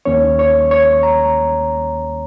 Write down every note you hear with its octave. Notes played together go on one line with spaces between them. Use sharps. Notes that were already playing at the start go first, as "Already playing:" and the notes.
D#2 D#3 A#3 C#4 C#5
C#5
C#5
A#5